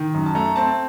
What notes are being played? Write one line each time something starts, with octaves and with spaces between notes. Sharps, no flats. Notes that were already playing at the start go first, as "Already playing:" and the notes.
Already playing: D#3
F#2
A5
A3 A#5
C4 A5